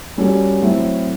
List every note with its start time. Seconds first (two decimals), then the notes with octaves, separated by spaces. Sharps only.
0.18 G3 A#3 C#4 F#4 A4
0.61 A2 F#3 A3 C4 E4